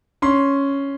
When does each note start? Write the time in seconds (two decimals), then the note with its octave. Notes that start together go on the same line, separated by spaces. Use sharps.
0.22 C#4 C6